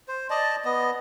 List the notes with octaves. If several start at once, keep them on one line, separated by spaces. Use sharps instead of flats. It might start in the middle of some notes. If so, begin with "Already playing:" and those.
C5
D5 D#5 A5
B3 D#5